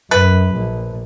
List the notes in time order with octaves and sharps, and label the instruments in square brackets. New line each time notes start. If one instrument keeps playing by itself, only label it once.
[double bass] F#2 [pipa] B4
[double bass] A#1